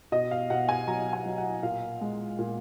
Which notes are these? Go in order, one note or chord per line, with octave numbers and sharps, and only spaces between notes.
B2 D#5
F5
B2 F#5
G#5
F#3 A#5
G#5
F#3
F#5
A#2 F5
G#3
A#2